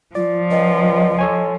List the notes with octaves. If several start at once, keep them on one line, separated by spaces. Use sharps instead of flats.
F3 F4 D5
C#2 D#5
A4 C#5 G#5